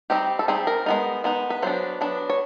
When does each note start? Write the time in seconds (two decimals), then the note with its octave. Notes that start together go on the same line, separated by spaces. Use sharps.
0.10 G3 C4 D#4 G4
0.39 A4
0.48 G3 C4 D#4 G#4
0.67 A#4
0.86 G#3 B3 D#4
1.24 G#3 B3 D#4
1.50 B4
1.62 F#3 B3 D4 C5
2.01 F#3 B3 D4
2.30 C#5